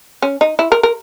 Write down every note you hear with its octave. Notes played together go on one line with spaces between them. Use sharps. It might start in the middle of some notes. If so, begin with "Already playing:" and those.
C#4
D#4
E4
A#4
A#4